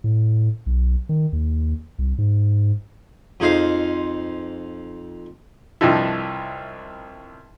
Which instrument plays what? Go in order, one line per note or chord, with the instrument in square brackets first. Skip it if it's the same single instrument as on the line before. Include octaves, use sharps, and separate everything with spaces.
[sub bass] A2
B1
D#3
D#2
C2
G#2
[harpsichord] F2 D#4 G#4 C5 F5
[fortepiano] C2 G2 F3 D#4 E4